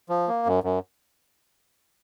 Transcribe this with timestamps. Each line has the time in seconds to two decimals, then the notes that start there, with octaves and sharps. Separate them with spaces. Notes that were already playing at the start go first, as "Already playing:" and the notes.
0.09 F3
0.28 A#3
0.46 F#2
0.64 F#2